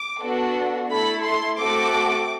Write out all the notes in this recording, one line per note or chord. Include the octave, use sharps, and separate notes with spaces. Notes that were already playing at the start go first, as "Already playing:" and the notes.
Already playing: D6
B3 D4 F#4 A4
A3 E4 A4 B5
C6
A3 C4 F#4 A4 D6